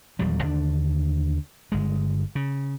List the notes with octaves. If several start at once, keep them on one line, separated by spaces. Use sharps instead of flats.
D#1 E2 F#3 G3
D#2 D3 D4
G1 G#3
C#3